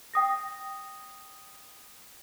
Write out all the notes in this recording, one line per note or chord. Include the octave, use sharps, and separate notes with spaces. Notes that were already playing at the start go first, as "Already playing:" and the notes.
G5 D#6 A#6